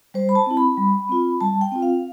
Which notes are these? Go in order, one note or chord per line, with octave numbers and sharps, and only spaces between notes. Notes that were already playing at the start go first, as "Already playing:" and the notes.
G3 C5
B5
A5
C4 E4
B5
G3
C4 F4
G3 A5
G5
C4 F4
F5